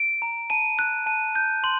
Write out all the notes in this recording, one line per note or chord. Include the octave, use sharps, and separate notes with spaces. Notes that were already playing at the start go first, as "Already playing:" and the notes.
Already playing: D7
A#5
A5 D#7
F#6
A5 D#7
G6
C6 F#7